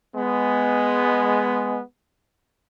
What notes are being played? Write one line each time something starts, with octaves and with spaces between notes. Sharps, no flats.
G#3 B3